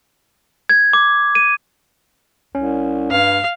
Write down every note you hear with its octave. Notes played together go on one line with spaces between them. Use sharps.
G#6
D6
D#7
C2 C#4
G2 F5